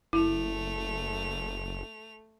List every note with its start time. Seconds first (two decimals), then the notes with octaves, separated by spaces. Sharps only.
0.13 F#1 A3 E4 F7